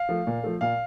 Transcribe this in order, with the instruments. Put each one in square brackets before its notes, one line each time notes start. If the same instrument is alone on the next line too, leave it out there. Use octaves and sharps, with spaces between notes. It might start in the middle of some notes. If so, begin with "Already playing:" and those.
Already playing: [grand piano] F5
F3 A3
A#2
F3 A3
A#2 F5